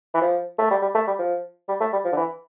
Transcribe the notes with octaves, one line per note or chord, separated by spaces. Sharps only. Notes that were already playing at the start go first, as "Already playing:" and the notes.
E3
F3
A3
G3
G3
A3
G3
F3
G3
A3
G3
F3
D3
E3